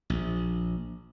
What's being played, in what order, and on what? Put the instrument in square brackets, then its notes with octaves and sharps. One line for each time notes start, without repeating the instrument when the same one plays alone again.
[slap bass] A#1